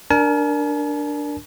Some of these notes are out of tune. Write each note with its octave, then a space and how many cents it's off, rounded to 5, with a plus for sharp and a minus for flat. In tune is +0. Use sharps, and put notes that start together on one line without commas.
D4 +0 A#4 +5 G#5 +45